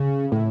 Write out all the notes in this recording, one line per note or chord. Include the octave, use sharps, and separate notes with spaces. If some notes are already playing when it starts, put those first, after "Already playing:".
Already playing: C#3
A2